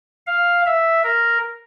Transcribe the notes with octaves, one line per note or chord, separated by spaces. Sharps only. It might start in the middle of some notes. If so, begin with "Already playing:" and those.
F5
E5
A#4